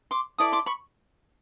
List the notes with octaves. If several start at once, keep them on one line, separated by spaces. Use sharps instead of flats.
C6 D6
E4 A4 D5 D#6
C6 D6
B5 C#6